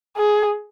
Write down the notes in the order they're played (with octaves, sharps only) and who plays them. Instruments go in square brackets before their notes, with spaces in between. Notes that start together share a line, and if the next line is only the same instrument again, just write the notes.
[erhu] G#4